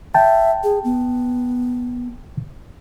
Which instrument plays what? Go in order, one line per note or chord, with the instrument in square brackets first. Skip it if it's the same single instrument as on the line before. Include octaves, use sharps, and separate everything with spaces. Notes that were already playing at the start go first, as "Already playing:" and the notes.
[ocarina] E5 [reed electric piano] G5 A5
[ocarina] G#4
B3